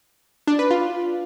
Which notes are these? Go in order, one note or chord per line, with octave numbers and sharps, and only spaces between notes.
D4
B4
F4